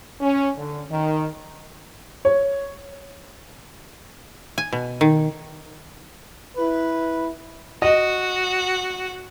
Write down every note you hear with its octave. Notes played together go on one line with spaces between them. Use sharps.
C#4
D3
D#3
C#5
G#5
B2
D#3
E4 B4
F#4 D#5